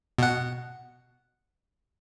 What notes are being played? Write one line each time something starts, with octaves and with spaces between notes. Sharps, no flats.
B2 F#5